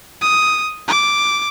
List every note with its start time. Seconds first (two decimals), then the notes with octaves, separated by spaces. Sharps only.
0.21 D#6
0.88 D6